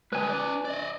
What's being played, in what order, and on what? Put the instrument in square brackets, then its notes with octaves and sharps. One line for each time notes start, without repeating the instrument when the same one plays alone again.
[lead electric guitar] D3 G#3 [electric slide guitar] B4 G#5
[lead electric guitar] C#4 D5
D5 D#5